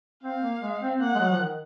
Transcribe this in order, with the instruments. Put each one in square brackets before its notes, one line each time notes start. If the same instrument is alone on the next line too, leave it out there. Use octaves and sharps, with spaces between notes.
[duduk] C4 [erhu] F5
[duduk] A#3
G#3
C4
[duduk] A#3 [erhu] F#5
[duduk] G#3
F#3
F3
D#3